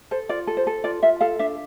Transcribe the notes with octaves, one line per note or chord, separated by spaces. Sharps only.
A4 C5
F4 D5
A4
C5
A4
F4 D5
F4 E5
A4 F5
D4 E5